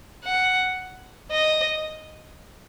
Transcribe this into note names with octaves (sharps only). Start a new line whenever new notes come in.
F#5
D#5